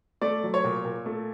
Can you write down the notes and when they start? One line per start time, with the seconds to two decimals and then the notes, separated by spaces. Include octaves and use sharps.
0.22 A3 D5
0.43 F#3
0.54 C#5
0.64 A#2
0.85 A#2
1.06 A3